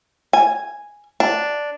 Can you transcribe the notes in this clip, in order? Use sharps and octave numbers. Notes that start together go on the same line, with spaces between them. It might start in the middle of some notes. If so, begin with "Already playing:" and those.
G#5
D4